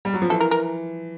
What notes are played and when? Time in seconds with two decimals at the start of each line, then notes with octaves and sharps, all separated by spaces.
0.05 G3
0.14 F#3
0.22 F3
0.30 E3 A4
0.40 A#4
0.51 A#4